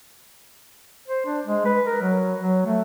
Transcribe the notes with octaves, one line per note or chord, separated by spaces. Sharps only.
C5
D4
G#3
B4
A#4
F#3
F#3
A3